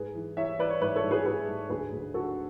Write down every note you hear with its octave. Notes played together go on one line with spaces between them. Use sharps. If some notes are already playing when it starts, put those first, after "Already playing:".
Already playing: G#2 G#4 B4
E3
E3 C#5 E5
E3 B4 D5
C#5
G#2 B4 D5
A4 C#5
G#2
G#4 B4
G#2 G#4 B4
G#2
D2 G#4 B4
D2
D3 F#4 A4